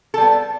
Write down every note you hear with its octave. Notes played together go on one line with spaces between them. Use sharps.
G3 B3 A4